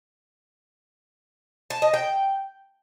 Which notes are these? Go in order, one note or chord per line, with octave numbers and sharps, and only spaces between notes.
A5
D#5
G5